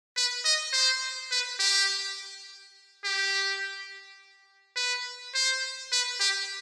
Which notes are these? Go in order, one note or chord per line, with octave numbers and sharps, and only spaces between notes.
B4
D#5
C5
B4
G4
G4
B4
C5
B4
G4